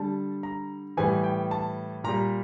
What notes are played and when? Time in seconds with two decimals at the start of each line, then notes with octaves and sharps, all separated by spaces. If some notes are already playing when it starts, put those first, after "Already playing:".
Already playing: D3 G3 A5
0.43 A#5
0.97 A2 E3 G3 G#5
1.24 G5
1.51 A5
2.04 A#2 G3 A#5